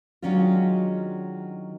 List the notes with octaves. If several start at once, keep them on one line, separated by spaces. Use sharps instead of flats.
D#3 F#3 G#3 C#4 D4 F4